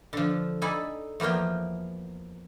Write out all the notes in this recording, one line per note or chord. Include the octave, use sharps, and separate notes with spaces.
D3 F3
D#4 A4 D5 G#5 B5
E2 F3 A#3 A#4 G5